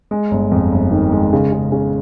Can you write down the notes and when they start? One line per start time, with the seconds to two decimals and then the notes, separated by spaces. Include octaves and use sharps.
0.11 G#3
0.31 G1
0.52 F2
0.72 G1
0.91 D#3
1.12 G#3
1.33 C#3
1.52 C#3
1.72 C#3